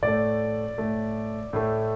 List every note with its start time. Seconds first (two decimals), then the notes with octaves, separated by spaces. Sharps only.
0.02 A2 D5
0.08 A3
0.78 A2 A3
1.53 A2 A3